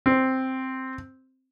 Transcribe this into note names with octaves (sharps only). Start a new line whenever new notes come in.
C4